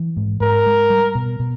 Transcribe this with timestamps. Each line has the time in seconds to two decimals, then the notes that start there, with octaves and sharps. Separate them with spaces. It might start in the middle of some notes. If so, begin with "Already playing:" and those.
Already playing: E3
0.17 G#2
0.40 G#2 A#4
0.66 G#3
0.90 G3
1.15 B2
1.39 B2